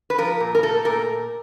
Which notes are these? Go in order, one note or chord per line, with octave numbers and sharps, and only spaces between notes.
B4
F3 A#4
A#2
A#4
A3 A4
A#2 A#4